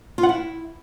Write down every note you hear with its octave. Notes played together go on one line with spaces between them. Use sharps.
F4
F#5
E4